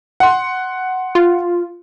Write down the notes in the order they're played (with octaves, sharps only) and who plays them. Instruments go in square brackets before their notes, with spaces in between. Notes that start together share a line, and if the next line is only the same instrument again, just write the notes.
[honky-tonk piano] F#5 C6
[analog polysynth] F4